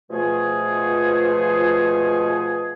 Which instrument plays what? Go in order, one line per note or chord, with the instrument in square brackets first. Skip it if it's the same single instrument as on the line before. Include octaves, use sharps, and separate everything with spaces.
[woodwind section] B2 F3 A3 G#4